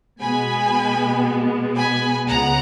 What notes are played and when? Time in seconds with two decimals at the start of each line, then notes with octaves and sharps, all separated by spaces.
0.20 B2 G#3 B3 G#5 B5
1.76 G#5 B5
2.28 C#2 C#3 G#3 B3 F#5 A#5